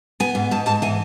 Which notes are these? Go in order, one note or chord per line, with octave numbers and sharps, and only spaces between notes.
B3 G#5
G#2
G#2 A5
G#2 A5
E3 G#5